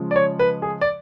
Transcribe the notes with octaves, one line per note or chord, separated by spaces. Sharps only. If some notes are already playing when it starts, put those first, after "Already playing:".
Already playing: C#3 F3 G#3
D5
C#5
B4
G#4
D5